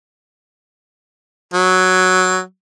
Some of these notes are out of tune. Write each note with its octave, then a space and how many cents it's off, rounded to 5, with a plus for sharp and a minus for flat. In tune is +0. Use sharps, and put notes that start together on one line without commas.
F#3 +0